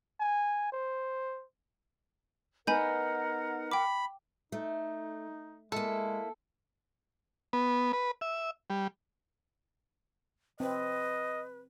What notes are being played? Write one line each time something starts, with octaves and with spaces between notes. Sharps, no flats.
G#5
C5
B3 D#4 A#4 F#5 G#5 B5 G6
G5 B5 D6
A3 D#4
G#3 A#3 E4 A4
B3
B4
E5
G3
C4 B4 D#5